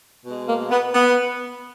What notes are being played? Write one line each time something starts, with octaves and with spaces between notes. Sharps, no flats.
B2 G#3
A#3
B3
B3